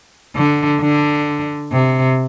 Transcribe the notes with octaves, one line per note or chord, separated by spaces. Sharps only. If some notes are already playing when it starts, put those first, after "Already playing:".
D3
D3
C3